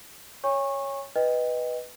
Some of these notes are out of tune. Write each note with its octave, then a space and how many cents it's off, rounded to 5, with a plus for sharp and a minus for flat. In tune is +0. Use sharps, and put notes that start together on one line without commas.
C#5 +0 G#5 -35 C#6 -20
B4 +0 D#5 +0 G5 +20